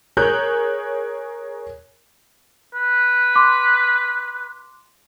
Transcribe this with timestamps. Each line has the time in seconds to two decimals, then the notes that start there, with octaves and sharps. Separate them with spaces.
0.17 G#4 A#4 C#5 F#6 G6
2.75 B4
3.36 C6 D6